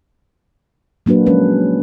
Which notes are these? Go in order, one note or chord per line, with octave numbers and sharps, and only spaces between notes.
F#3 A#3 D4 F#4 B4
F3 G#3 C#4 B4